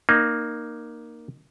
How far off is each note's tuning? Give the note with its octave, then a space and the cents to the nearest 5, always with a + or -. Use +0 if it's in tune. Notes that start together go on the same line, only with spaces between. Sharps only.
A#3 +5 D#4 -25